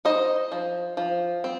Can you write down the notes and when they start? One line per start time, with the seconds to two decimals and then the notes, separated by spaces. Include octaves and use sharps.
0.05 D#4 C5 D#5
0.52 F3
0.97 F3
1.44 C4